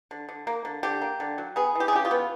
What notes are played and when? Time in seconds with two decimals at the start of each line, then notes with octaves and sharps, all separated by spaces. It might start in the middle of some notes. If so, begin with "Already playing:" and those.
0.11 D3
0.29 D3
0.47 A#3
0.65 D3
0.83 D3 G4
1.02 A#3
1.20 D3
1.38 F#3
1.56 B3 G#4
1.75 E3 G4
1.88 G#4
1.93 C#3 G4
2.05 F4
2.11 B3